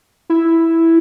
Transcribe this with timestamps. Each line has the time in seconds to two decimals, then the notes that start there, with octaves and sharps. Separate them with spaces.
0.30 E4